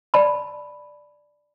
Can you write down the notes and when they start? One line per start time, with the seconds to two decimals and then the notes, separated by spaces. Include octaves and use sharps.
0.14 D5 A5 B5